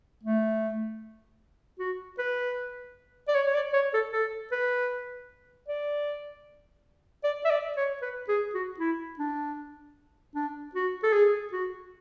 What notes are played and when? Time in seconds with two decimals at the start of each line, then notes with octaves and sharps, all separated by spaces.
0.23 A3
1.79 F#4
2.19 B4
3.28 D5
3.35 C#5
3.47 C#5
3.54 D5
3.74 C#5
3.94 A4
4.13 A4
4.52 B4
5.68 D5
7.24 D5
7.45 E5
7.50 D5
7.77 C#5
8.02 B4
8.28 G#4
8.55 F#4
8.80 E4
9.19 D4
10.35 D4
10.75 F#4
11.03 A4
11.13 G#4
11.52 F#4